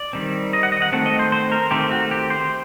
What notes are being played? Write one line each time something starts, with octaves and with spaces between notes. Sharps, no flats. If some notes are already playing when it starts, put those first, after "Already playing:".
Already playing: D5
D#3 G3 C4
D#5
F#5
D#5
F#5
D#3 A3 C4 F#5
D#5
C5
C5
A#4
D#3 A3 C4 G4
F#4
G4
C5